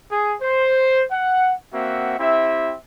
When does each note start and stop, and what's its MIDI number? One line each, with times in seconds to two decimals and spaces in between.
0.11 0.33 68
0.41 1.03 72
1.12 1.54 78
1.74 2.15 58
1.74 2.15 60
1.74 2.15 66
1.74 2.15 76
1.74 2.15 78
2.19 2.75 60
2.19 2.75 64
2.19 2.75 67
2.19 2.75 76